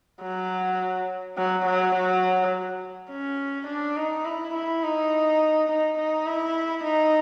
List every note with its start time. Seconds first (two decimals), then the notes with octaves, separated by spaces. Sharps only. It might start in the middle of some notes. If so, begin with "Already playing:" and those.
0.22 F#3
1.38 F#3
1.66 F#3
1.95 F#3
3.10 C#4
3.67 D4
3.97 D#4
4.25 E4
4.54 E4
4.83 D#4
5.69 D#4
5.98 D#4
6.27 E4
6.84 D#4